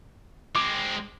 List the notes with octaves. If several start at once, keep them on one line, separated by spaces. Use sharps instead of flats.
G#3 C4 D6